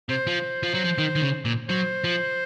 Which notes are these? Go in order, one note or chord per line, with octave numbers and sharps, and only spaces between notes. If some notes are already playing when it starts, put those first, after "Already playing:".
C3 C5
F3
F3
F#3
F3
D#3
D#3
C#3
A#2
F#3 C5
F3